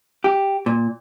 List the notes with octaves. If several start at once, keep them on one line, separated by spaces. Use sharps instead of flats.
G4
A#2